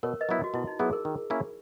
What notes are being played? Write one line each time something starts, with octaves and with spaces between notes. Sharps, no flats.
B2 A#4 C#5
B4 D#5
F#3 B3 E4
F#4
B2 E4
D#4
F#3 B3 E4 G#4
A#4
D#3
A#3 C#4 E4